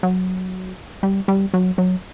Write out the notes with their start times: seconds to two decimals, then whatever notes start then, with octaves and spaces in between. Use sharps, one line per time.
0.03 F#3
1.03 G3
1.28 G3
1.54 F#3
1.78 F#3